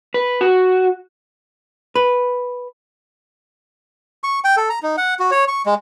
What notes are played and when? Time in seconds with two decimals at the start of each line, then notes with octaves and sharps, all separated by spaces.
0.14 B4
0.41 F#4
1.95 B4
4.24 C#6
4.44 G5
4.57 A4
4.70 A#5
4.83 D#4
4.98 F#5
5.19 F#4
5.31 C#5
5.48 C#6
5.66 G#3